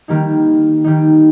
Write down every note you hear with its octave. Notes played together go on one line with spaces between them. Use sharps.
D#3 G3 A#3 D#4
D#3 G3 A#3 D#4